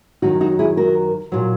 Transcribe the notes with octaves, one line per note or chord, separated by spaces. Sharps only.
F#2 D#3 F#3 D#4 F#4
D#4 F#4
E4 G#4
F#4 A#4
A#2 F#3